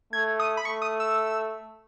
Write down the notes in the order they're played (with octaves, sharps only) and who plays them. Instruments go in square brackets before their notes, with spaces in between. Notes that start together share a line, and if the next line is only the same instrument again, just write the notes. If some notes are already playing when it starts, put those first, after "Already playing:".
[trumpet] A3 [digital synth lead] G#6
[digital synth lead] D#6
B5
[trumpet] A3 [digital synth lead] C#6
[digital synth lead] D#6
E6